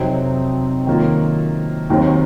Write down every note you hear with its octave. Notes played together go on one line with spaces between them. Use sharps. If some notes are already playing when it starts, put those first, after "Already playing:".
Already playing: F2 C3 F#3 C4 D#4
D#3 F#3 A#3 F4
D#2 D#3 F#3 C4